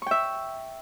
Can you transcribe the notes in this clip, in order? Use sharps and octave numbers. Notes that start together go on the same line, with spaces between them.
E5 G5 C#6